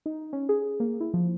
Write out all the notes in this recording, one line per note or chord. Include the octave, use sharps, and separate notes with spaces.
D#4
C#4
G#4
A#3
E4
F3